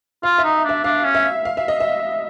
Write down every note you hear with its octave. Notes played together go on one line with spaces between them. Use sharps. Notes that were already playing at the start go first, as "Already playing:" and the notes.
F4 F5
E5
D#4
D4
E5
D4 F5
C#4
E5
F5
E5
D#5
E5